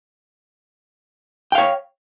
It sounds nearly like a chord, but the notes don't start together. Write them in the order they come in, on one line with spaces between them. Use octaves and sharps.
G5 F5 C#5